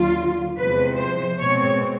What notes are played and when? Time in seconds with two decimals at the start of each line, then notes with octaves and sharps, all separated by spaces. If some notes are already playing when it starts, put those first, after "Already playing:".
Already playing: D#2 D3 F#3 F4
0.57 E2 C3 F3 G#3 B4
0.98 C5
1.39 B2 G#3 C4 C#5